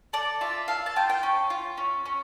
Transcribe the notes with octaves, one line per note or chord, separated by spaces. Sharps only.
A4 D5
F4 E5
A4 F5
A5
F4 G5
G5
C#4
F4
C#4
C#4